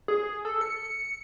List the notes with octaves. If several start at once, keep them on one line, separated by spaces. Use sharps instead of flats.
G#4
A4
C#7